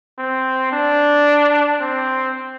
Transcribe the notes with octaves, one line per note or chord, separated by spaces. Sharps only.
C4
D4
C4